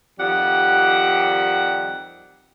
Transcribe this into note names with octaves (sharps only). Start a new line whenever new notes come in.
F2 D#3 G3 G4 F#5